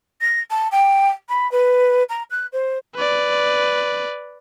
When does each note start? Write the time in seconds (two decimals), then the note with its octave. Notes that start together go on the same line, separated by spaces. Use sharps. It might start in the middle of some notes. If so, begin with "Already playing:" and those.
0.21 A#6
0.50 A5
0.71 G5
1.28 B5
1.51 B4
2.09 A#5
2.30 F#6
2.52 C5
2.95 B4 D5